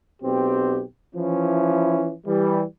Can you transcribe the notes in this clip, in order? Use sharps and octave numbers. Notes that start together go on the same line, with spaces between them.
B1 B2 C4 G4
E3 F3 C#4 E4
E3 G3